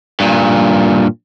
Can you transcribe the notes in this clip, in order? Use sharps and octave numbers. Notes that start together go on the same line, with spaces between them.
G2 A#2